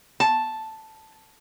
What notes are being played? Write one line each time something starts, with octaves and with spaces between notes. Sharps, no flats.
A5